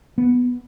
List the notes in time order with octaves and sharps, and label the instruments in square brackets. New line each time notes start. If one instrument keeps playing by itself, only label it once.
[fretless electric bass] B3